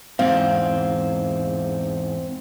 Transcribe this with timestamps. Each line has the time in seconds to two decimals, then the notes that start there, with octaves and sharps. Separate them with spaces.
0.19 E2 G#2 C4 F5